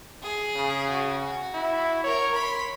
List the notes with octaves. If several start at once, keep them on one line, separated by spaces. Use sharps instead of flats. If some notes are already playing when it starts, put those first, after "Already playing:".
G#4
C#3
F#4
E4
A#4 C#5
B5 C6